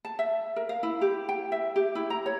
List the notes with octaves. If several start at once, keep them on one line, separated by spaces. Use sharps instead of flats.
A5
E5
A#4
F5
E4
G4
G5
E5
G4
E4
A#5
C#5